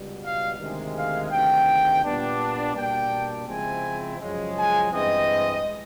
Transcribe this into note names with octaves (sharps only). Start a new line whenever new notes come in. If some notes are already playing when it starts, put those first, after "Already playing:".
Already playing: C#2 B2 G3
F5
D2 C3 D#3 G#3
F5
D2 C3 D#3 G5
A#2 G3 B3 D4
B2 G3 A#3 D4 G5
C#3 F3 G#3 C4 E4 G#5
F#2 C#3 F3 G#3
G#5
G2 E3 G#3 C4 D#5